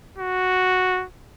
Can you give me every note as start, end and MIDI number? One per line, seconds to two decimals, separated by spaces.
0.19 1.05 66